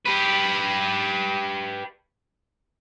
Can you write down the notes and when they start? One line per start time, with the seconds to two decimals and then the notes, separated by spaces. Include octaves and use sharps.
0.06 G4 B4